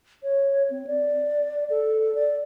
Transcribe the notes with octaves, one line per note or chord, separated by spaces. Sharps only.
C#5
C4
D5
A4
D5